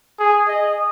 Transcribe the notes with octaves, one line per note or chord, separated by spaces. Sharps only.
G#4
D#5